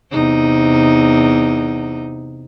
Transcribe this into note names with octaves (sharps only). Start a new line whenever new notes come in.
E2 C3 D#4